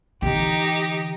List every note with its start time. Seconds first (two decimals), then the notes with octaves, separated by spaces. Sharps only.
0.22 D3 E3 D#4 G4